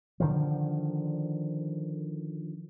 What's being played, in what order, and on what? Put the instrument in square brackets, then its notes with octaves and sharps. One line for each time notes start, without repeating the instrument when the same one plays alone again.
[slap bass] D3 D#3 F3